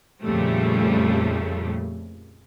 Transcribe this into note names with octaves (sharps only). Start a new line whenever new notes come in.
F2 A#2 C#3 G3 A3